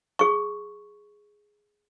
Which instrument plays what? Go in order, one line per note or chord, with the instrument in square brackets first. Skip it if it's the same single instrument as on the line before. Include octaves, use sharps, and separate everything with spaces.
[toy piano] G#4 C#6